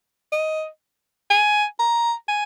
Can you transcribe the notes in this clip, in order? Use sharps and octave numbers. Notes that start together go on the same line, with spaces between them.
D#5
G#5
A#5
G#5